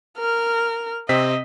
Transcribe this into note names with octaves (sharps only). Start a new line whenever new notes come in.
A#4 F6
C3 C4 D#5 B6